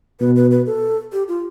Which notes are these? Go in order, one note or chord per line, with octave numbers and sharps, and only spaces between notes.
B2 B4
B4
B4
A4
G4
F4